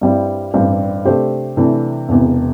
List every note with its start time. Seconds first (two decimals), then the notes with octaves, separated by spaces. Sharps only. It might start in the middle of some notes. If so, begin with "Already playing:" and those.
0.01 G2 G3 C4 E4
0.54 A1 G2 G3 C4 G4
1.05 C3 A3 D4 G4 C5
1.57 C3 E3 A3 D4
2.09 E1 E2 C3